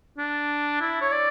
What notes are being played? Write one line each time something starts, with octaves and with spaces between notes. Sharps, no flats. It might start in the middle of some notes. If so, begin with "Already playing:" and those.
D4
E4
C#5
D5